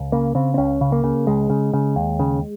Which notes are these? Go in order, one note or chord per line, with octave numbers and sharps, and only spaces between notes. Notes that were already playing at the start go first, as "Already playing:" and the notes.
Already playing: C#2
C#3 A#3
C#3 C4
C4
C#2 C#4
C#3
A#3
C#3
C#2 G#3
C#3
C#3
D#2
C#3